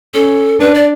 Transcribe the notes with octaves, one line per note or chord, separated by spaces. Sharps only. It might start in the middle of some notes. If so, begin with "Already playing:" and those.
C#4 A4
D4 B4
D5